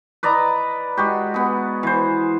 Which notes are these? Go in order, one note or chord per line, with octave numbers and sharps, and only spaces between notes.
B4 D5 D#5 A#5
G#3 F#4 G4
B3 G#4
E3 C5